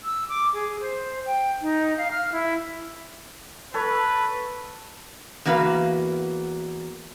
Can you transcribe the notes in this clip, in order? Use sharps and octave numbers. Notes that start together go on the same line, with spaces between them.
E6
D6
G#4
C5
G5
D#4
F5
F6
E4
A4 B4 C#5
E2 A#3 F#4 B4 F5